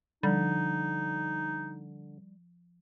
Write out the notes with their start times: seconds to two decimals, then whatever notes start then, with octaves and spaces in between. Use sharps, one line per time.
0.23 D3 F3 G3 D#4